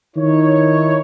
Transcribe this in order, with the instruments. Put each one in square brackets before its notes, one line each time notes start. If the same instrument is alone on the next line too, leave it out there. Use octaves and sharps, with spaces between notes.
[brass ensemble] D#3 D#4 E4 C#5